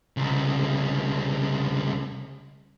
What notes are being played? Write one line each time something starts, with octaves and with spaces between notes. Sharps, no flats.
C2 C#3